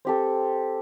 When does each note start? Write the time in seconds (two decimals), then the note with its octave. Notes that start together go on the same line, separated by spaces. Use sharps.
0.05 C4 G4 A4